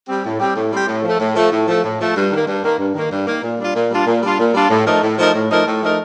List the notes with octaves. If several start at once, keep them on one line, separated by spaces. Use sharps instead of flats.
G3 C4 G4
A2
G3 C4 G4
A2
G3 C4 G4
A2
F3 A3
A2
F3 A3
A2
F3 A3
A2
F3 A3
G2
D#3 A#3
G2
D#3 A#3
G2
D#3 A#3
G2
D#3 A#3
A#2
G3 D4 F4
A#2
G3 D4 F4
A#2
G3 D4 F4
A#2
G3 D4 F4
A2
F3 A3 D#4 A#4
A2
F3 A3 D#4 A#4
A2
F3 A3 D#4 A#4
A2
F3 A3 D#4 A#4